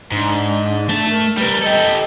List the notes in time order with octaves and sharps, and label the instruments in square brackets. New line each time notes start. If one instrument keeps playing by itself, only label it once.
[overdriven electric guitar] G#2 [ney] D4
[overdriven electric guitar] A3 A5
[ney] A#4
[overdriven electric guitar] G3 A#4 [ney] B4
[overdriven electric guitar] G4 A4 [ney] D#5